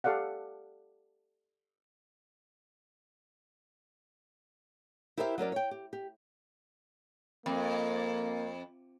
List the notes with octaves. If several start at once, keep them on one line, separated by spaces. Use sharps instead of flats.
G4 A4 D5 F5 F#5
E4 G4 A#4 C5 D#5 E5
F#3 C#4 A#4 D5
C#5 G5
G4
G4
F2 A#3